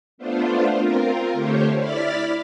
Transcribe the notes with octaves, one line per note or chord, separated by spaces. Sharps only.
A3 B3 D4 F4 C5
C4 F4 A#4
D3 A3 G4 C5 C#5
E4 D5 B5 F6 A6 B6